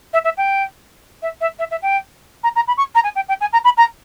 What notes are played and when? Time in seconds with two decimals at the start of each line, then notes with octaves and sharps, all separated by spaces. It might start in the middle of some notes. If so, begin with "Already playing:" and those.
0.13 E5
0.24 E5
0.37 G5
1.22 E5
1.41 E5
1.59 E5
1.71 E5
1.82 G5
2.43 A#5
2.56 A#5
2.68 B5
2.77 C#6
2.95 A#5
3.04 G#5
3.16 G5
3.29 G5
3.41 G#5
3.53 A#5
3.64 B5
3.77 A#5